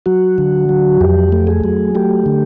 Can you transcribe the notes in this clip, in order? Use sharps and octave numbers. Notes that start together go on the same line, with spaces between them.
F#3 F#4
D3
F#3
F2 G4
A3
G#4
F#3
A3 G4
D3